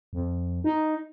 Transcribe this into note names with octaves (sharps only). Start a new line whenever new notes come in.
F2
D#4